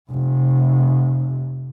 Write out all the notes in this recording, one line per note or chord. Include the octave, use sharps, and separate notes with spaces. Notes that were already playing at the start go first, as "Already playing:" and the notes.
F1 C3